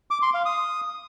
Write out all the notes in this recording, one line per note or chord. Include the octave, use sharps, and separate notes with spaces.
D6
C6
F5
D#6